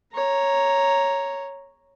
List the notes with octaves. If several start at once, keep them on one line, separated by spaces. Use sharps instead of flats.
C#5 A#5